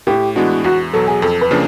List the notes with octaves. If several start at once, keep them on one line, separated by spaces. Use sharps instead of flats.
A2 G4
E3 G#3 B3 D4 F#4
E2 F#4
B2 F#3 A4
G#4
F2 A4
B4
C#3 F3 A#3 D4